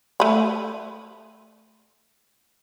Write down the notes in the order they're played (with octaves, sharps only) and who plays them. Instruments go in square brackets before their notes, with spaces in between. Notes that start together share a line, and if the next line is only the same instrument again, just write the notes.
[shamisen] A3 B5